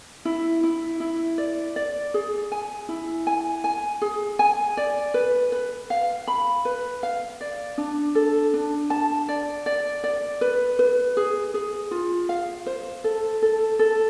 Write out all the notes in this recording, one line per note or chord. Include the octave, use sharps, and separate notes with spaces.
E4
E4
E4
D5
D5
G#4
G#5
E4
G#5
G#5
G#4
G#5
D5
B4
B4
F5
B5
B4
F5
D5
D4
A4
D4
A5
D5
D5
D5
B4
B4
G#4
G#4
F4
F5
C5
A4
A4
A4